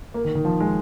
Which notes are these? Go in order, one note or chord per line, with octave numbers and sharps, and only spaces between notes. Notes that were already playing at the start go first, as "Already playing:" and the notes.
A#3
D#3
D#3
F3
G#3